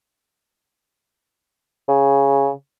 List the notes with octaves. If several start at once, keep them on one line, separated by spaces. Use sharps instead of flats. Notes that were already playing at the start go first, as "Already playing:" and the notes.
C#3